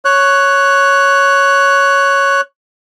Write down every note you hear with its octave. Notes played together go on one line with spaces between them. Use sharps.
C#5 F#6